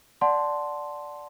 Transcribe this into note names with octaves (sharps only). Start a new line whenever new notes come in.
D5 F#5 A5 C6